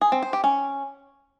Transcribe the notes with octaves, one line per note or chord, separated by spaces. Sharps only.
G#4
C4
C5
G4
C#4